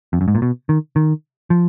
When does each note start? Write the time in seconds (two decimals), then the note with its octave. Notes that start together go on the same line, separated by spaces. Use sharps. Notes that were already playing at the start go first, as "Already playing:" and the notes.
0.13 F2
0.21 F#2
0.28 G#2
0.35 A#2
0.42 B2
0.69 D#3
0.96 D#3
1.50 F3